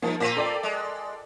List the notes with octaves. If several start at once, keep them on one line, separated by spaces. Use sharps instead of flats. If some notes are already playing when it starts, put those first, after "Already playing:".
G2 F3 A#3
A#2 A#3 C4 F4 B6 D#7
A4 D5 G5
G#3